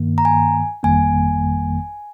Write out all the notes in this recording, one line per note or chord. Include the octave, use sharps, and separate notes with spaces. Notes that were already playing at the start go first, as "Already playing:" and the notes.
Already playing: G2 D#3 A#3
A#5
G#5
G1 F2 D#3 G3 A#3 G#5